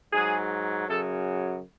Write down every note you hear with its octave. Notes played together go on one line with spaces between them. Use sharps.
G#2 F#3 G#4
F#2 C#3 F#3 A4